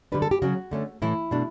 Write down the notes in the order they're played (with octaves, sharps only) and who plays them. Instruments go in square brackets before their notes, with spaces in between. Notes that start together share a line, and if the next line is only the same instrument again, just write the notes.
[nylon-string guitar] D3 G3 D4 B4
A4
G4
C#3 F#3 C#4 F#4
D3 A3 C#4
A2 E3 A3 E4
B2 A3 D4